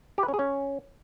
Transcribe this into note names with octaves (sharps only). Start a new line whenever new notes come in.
G4
B4
C#4
G#4
C#4